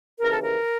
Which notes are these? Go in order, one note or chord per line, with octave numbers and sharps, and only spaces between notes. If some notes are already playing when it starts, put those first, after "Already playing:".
D#2 C#3 E3 A#4
A4
A#4